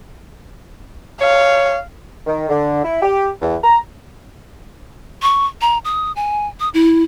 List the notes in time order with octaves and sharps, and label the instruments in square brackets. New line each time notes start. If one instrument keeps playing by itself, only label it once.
[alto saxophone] C#5 [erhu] F5
[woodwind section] D#3
D3
E4
G4
E2
A#5
[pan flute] C#6
A#5
D#6
G#5
D#6
E4